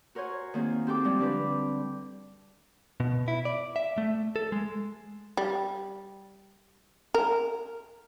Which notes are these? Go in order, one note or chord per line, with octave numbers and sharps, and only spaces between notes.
F#4 A#4 C5 C#5 G#5
D#3 A#3 C4 G#4
C4 G4 A4 G5 D6
F3 G3 G#3
D3 D4 G4 B4 D6
B2
E4
D5
E5
A3
A4
G#3
G3
A#4